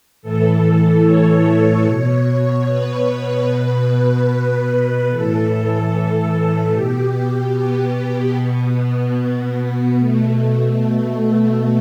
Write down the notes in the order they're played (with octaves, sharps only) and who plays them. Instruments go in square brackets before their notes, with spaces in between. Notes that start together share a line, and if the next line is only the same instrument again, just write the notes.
[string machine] A2 E3 A4
C#5
B2 C#5
C#5
B4
B2
A2 E3 A4
B2 G4
B3
B2
B2 A3
A3
A3